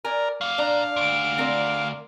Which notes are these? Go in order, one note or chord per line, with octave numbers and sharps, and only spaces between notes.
A#4 D5 G#5
F#3 A#3 F5
A#2 D4 D5 A#5
D2 G#2 D7
C4 A#4 D5